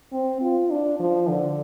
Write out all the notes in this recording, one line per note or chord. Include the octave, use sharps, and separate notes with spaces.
C4
F4
D4
F3
D3